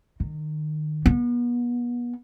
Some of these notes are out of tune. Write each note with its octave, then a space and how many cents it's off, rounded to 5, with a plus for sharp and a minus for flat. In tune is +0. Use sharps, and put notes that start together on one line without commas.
D#3 -30
B3 -35